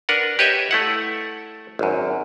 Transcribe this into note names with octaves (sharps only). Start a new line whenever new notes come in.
D4 A#4 B4 F#5
G4 B4 C#5 D#5 E5
A3 E4 F#5
G#1 F#2